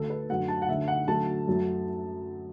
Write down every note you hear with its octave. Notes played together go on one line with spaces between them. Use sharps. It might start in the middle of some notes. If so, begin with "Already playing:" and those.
Already playing: D2 D3 A3 A4
B4
F#2 D3 F#3 A3 F#5
A5
F#5
D2 D3 A3 E5
F#5
D2 D3 F#3 A3 A5
F#2 F#3 A3